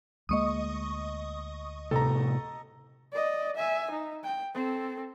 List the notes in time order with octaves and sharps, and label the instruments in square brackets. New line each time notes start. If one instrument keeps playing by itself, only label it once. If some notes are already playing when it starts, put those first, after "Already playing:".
[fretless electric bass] D2 G#3 A#3 [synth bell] D#5 C#6 D#6
[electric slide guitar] A2 C3 [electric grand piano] A4 A#5
[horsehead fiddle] D5 D#5
E5 G#5
D#4
G5
C4 A4